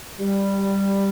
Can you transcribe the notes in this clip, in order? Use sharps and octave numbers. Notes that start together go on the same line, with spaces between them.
G3